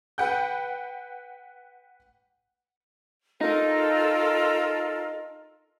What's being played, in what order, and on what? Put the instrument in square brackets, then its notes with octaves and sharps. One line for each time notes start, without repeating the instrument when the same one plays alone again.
[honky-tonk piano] B4 F#5 G5 G6
[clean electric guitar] D#4 [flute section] F4 A4 A#4